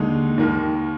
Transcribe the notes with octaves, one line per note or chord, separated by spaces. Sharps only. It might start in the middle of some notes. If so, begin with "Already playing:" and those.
Already playing: D#2 D3 G#3 D#4
D#2 D#3 A#3